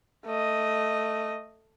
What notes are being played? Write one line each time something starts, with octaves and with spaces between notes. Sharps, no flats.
A3 D#5